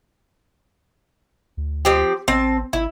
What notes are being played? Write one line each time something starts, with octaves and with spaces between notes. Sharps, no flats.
D2
F3 C4 G4
A1 C4 A5
G#1 E4